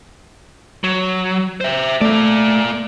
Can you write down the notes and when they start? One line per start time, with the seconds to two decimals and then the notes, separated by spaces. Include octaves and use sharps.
0.84 F#3
1.61 C5 E5
2.01 A3 A#3 D5